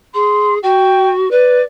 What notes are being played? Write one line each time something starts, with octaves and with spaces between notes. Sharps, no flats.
G#4 C6
F#4 G5
B4 D5